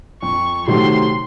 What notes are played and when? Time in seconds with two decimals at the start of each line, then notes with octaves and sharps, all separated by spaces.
0.22 F2 C#6
0.68 C3 D#3 F#3 A3 C6